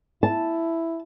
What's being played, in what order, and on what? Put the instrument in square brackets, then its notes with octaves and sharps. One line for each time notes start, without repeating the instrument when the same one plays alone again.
[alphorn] E4 [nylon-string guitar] A5